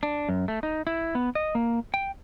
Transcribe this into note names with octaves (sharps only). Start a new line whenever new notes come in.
D4
F#2
A3
D#4
E4
B3
D#5
A#3
G5